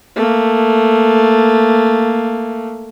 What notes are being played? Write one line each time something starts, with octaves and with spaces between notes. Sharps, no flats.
A3 A#3